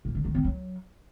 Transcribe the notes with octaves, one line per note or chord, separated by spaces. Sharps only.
A#2
D3
D#3
C4
F#3